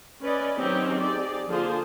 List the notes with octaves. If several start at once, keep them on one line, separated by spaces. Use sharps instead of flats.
C#4 B4 D5 D#5
D#3 F#3 C4 C#4 D#4 G4
D#4 G4 G#4 D5
D3 F3 A#3 F4 G#4 C5